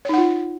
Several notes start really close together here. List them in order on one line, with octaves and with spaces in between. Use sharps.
C#5 D#4 F#5 F4